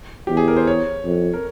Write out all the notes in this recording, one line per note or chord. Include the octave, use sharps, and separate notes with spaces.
E2 G4
G#4
A#4
C5
C#5
F2
A#4